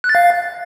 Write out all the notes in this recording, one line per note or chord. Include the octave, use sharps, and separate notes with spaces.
F#6
A6
F5